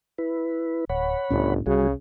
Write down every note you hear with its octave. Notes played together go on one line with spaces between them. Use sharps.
E4 B4
D1 C#5 F#5 B5
G1 C#2 A2 C#4
C2 C#3 G3 F#4 G#4